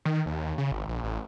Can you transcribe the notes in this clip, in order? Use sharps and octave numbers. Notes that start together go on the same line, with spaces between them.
D#3
D#2
C#3
G#1
A#1
A1